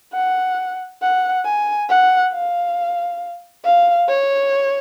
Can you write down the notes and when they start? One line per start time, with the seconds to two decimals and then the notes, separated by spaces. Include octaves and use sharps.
0.13 F#5
1.02 F#5
1.45 G#5
1.89 F#5
2.33 F5
3.64 F5
4.08 C#5